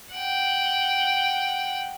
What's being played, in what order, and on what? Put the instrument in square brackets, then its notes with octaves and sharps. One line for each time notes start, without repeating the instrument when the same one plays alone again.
[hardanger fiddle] F#5 G5